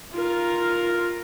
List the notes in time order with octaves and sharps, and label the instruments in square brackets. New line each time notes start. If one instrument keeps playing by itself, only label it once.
[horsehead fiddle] F4 A#4